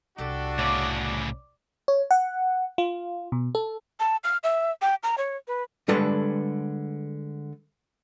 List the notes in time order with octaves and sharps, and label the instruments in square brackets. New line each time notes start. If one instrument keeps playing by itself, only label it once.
[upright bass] C2 [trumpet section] D4 F#4 [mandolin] G4 A4
[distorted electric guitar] A2 C#3 [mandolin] D5
[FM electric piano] C#5
F#5
F4
B2
A4
[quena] A5
F6
E5
G5
A#5
C#5
B4
[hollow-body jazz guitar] D3 G3 G#3 A4 B4 C6